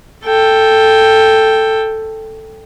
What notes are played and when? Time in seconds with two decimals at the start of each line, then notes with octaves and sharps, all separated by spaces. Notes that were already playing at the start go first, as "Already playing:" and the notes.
0.25 A4 G5